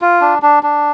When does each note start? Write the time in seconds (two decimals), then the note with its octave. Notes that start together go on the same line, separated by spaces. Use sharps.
0.02 F4
0.21 D4
0.42 D4
0.63 D4